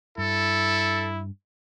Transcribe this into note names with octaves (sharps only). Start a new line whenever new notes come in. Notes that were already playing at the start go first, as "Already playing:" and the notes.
G2 E4 A4